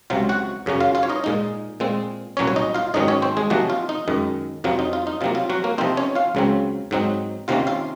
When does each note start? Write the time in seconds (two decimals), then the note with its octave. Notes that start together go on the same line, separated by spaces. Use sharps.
0.10 C#2 C3 F#3 F4 F5
0.29 F#4 F#5
0.66 F#2 C#3 F#3 C#4
0.80 F4 F5
0.95 F4 F5
1.03 C#5
1.09 D#4 D#5
1.24 A#2 G#3 D#4
1.80 A#2 G#3 C4
2.37 C2 A#2 F#3 C#4 C#5
2.47 C#5
2.56 D#4 D#5
2.75 F4 F5
2.94 G#2 D#3 F#3 C#4 D#4 D#5
3.08 C#4 C#5
3.22 C4 C5
3.37 G#3 G#4
3.50 C3 F3 F#3 A#3 D#4 F#4
3.70 F4
3.89 D#4
4.08 F#2 D#3 G#3
4.64 F2 C3 F#3 F4
4.79 D#4
4.93 F4
5.07 D#4
5.21 C3 F#3 A#3 F4
5.35 F4
5.50 F#3 F#4
5.64 A#3 A#4
5.78 C3 F3 C4 D#4 C5
5.97 C#4 C#5
6.15 F4 F5
6.35 C#2 C#3 F#3 C4
6.91 G#2 F#3 C4 D#4
7.48 C3 D#3 A#3 C#4 F4 F5
7.67 F4 F5